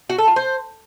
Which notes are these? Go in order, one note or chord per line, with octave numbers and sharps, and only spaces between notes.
F#4
A4
F4
C5